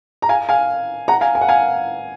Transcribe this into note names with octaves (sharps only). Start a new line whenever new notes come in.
A#5
F5 G#5
F5 G#5
F#5 A#5
F5 G#5
G#5
F#5
F5 G#5